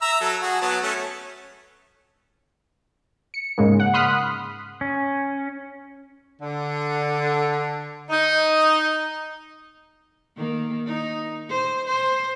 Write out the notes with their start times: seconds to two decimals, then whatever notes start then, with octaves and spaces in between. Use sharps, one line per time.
0.02 E5 A#5 E6
0.21 F#3 A4
0.42 F#4 G#4
0.61 F#3 B3 A5
0.82 A3 C#4
3.34 C#7
3.58 G#2 C#3 G#3 A#3
3.80 F#5
3.94 B5 C6 D#6 F6 F#6 B6
4.81 C#4
6.41 D3
8.10 D#4
10.36 D#3 A#3
10.86 D#4
11.49 C5
11.87 C5